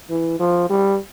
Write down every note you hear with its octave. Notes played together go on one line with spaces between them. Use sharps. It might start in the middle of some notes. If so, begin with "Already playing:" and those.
E3
F3
G3